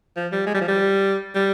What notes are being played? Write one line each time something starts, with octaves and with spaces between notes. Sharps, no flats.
F3
G3
G#3
G3
F3
G3
G3